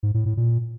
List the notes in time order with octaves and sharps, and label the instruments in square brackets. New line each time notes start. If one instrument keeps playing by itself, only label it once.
[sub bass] G#2
A2
A2
A#2